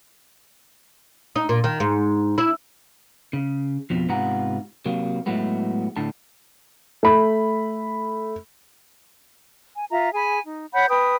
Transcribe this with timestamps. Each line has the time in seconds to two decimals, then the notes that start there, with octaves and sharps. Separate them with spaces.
1.36 D#4
1.49 A#2
1.64 D#3
1.80 G#2
2.38 E4
3.33 C#3
3.90 F2 B2 F3
4.09 G#2 C3 B3 F4 F#5 A#5
4.86 C3 F#3 A#3
5.26 A2 F#3 G#3 A3 B3
5.96 A2 D3 A5
7.03 A3 B5
9.77 G#5
9.91 F4 E5 A#5
10.13 G#4 G#5 B5
10.44 D#4
10.72 C#5 F#5 B5 G6
10.90 B4 G5 D#6